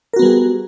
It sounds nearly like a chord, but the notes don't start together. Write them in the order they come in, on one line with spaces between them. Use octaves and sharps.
A#4 F#4 B3 G3 G#4